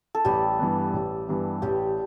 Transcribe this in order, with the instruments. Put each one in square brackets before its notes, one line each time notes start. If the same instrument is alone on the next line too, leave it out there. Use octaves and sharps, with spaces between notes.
[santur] A4
[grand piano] A1 [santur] G3 G4
[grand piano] G2 E3 B3
A1
G2 E3 B3
[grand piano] A1 [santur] G3 G4